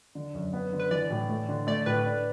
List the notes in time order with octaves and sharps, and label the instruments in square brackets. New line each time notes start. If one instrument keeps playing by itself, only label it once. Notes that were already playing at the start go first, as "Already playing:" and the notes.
[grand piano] D3
F#2
B3
D3
[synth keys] B4
[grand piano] E3 [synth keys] D5
[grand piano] A2
A3
D3
[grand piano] A3 [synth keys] D5
[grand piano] A2 [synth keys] B4
[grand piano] D4